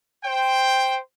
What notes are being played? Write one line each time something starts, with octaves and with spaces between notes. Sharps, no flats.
C5 G5